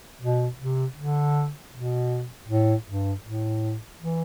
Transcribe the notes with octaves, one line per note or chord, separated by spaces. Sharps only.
B2
C3
D3
B2
A2
G2
A2
E3